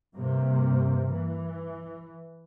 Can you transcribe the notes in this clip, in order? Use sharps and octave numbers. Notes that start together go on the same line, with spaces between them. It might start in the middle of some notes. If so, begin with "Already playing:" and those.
G2 C3 A#3
E3